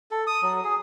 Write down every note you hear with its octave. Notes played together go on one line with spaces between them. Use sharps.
A4
D#6
F#3
G#4